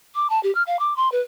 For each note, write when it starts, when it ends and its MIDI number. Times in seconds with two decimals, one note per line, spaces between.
0.15 0.27 86
0.30 0.42 81
0.43 0.53 67
0.55 0.63 89
0.67 0.79 77
0.79 0.96 86
0.97 1.11 84
1.12 1.20 71